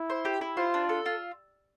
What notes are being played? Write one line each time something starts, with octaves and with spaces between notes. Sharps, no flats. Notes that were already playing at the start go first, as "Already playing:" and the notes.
Already playing: E4
C5
G4
E4
F4 C5
D4
A4
F4